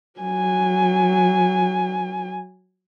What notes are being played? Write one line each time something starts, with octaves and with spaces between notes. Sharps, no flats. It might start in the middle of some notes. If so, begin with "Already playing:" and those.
F#3 G#5